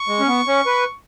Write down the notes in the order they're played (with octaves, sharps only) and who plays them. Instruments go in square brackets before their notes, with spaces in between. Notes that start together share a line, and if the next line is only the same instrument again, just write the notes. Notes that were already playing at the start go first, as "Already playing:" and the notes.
Already playing: [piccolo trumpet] C#6
[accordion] G#3
C#4
B3
C#4
B4